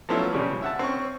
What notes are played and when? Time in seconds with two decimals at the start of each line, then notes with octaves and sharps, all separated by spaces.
0.09 F3 F#3 A3 B3 C#4 E4
0.33 A#1 C#3 G3
0.62 E5 F#5 A5
0.79 C4 C#4 C#6